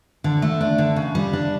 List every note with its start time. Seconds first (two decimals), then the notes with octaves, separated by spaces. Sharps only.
0.24 D3
0.42 A3
0.61 D4
0.78 D3
0.96 C#3
1.15 G3
1.33 D4